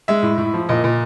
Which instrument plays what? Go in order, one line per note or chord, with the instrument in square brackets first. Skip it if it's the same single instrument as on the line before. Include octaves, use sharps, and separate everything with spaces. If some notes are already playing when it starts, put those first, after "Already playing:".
[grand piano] G#3 E5
A2
A2
F3
A#2 D#5
A#2